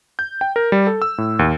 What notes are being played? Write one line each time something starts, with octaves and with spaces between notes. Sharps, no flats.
G6
G5
A#4
G3
A4
E6
A2
D#2